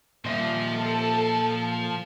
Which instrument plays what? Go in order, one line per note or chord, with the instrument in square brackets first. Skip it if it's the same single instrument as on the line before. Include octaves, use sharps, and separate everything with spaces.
[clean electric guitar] A#2 D#5 E5 [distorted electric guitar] F3 C5
[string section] A4